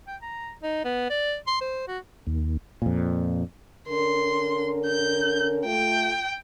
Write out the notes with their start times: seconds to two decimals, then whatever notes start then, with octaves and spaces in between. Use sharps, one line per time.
0.07 G5
0.22 A#5
0.63 D#4
0.84 B3
1.10 D5
1.47 C6
1.61 C5
1.88 F#4
2.27 D#2
2.82 F2 A#2
3.88 D3 C#4 A#4 C6
4.86 G6
5.65 A3 F4 G5